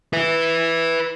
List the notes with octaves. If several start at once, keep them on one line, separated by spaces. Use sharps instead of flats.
B4 E5